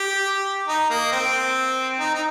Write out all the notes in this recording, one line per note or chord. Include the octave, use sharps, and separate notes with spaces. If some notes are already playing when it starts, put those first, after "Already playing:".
Already playing: G4
D#4
A#3
C4
D#4
D#4